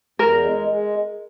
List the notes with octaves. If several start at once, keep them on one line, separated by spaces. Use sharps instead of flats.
E2 A#4
G#3
G#3